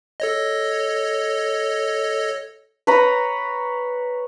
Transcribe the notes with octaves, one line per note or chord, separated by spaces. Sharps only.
A4 C#5 D#5
B4 C#5 A#5 B5